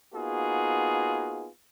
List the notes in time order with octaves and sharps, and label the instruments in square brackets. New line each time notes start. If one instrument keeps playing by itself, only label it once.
[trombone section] A#3 B3 D#4 F4 F#4 G#4